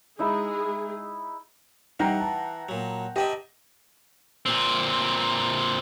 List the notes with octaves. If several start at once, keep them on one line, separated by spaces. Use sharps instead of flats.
G#3 D#4 E4 G#4 A#5
E3 G3 D#4 F#5 G5 A#5 C7
A5
A#2 F#3
D4 G4 B4 D#5 E5 G5
A#2 C4